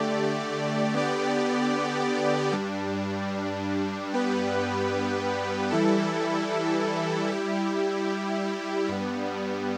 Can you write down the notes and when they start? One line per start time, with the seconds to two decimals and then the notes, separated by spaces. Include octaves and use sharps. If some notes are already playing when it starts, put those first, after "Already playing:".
Already playing: D3 A3 G4 D5
0.94 D3 B3 G4 D5
2.52 G2 G3 D4
4.11 G2 G3 B3 G4 B4
5.71 E3 G3 E4 A4
7.30 G3 E4 G4
8.88 G2 G3 B3